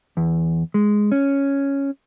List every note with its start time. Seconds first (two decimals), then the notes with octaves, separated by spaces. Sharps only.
0.17 E2
0.74 G#3
1.12 C#4